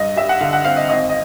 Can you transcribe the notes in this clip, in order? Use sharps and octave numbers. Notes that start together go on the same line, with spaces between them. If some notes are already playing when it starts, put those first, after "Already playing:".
Already playing: G2 D#5
G3 E5
F#5
D3 F5
F#5
C4 F5
D#5
G#1 D#5
D#5